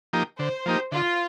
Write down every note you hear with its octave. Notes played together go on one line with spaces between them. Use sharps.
F3 A#3 D#4 G4
D3 C5
F3 A#3 D#4 G4
D3 F4